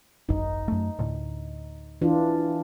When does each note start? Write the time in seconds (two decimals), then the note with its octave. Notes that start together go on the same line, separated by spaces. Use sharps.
0.29 D#1 G#1 F#2 D#4
0.68 F#2 A3
0.99 D2 A2
2.02 E3 D4 F4